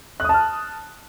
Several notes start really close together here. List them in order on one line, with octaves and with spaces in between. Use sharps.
F#6 D#6 A5 F6